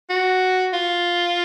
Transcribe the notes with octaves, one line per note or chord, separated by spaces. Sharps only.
F#4
F4